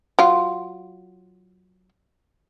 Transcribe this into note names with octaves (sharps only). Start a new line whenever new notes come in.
F#3 F4